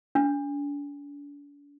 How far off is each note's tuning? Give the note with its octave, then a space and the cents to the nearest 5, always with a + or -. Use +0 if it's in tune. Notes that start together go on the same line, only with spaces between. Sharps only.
D4 -40